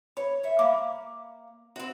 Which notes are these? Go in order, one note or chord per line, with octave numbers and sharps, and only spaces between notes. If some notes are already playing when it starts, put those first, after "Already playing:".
C#5 B5
C#5 E5
A#3 F5 B5 D6
C4 F#4